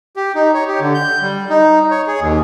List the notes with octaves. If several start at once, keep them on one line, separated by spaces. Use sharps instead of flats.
G4
D#4
C#5
G4
D3
G6
G3
D#4
C#5
G#4
D#2